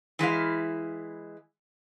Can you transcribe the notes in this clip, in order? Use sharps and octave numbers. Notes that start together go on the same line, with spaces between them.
E3 G#3 E4 F5